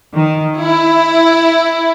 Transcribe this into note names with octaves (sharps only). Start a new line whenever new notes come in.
D#3
E4